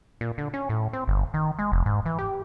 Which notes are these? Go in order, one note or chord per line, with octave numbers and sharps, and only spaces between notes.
A#2
D3
C#4
A2
C4
G1
D#3
G#3
F1
G#2
E3
G4